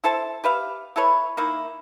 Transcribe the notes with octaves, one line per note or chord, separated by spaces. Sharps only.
E4 A4 C5 A5
G4 B4 E5 F5
E4 A4 B4 C#5
D#3 A#3 E4